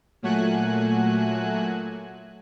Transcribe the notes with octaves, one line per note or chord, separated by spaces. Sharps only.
A#2 F#3 A3 F#4 G#5 F#6